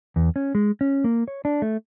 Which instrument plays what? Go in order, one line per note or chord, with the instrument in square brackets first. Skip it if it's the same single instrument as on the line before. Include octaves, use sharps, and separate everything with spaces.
[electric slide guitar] E2
C#4
G#3
C#4
A#3
C#5
D4
A3